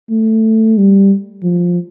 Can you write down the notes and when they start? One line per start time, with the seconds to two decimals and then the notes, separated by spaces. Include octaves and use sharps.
0.10 A3
0.78 G3
1.43 F3